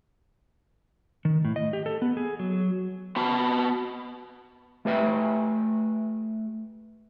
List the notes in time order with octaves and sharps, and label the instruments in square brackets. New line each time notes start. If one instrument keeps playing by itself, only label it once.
[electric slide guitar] D#3
A2
D#5
G4
A4
B3
G#4
F#3
B3 F#4 A5
[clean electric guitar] A3 G4 B4 E5 G5